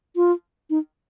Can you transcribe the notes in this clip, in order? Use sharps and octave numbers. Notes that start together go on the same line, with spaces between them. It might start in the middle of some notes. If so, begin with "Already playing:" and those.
F4
D#4